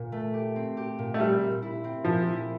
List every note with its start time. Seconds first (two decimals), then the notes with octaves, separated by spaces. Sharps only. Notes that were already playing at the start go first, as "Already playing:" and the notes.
Already playing: A#2
0.12 A3
0.34 G4
0.56 C4
0.77 G4
0.99 A#2
1.14 A3
1.20 G3 C4
1.41 A#2
1.62 E4
1.84 C4
2.05 A#2 F3
2.27 E4